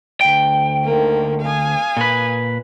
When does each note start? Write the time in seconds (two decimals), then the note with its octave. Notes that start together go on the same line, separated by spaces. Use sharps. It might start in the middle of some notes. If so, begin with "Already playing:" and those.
0.21 D2 G5
0.84 D3 D#3 A#3
1.41 F5 G#5 D#6
1.97 A#2 B4